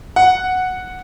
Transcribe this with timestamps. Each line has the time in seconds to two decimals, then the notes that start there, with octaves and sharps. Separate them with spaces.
0.16 F#5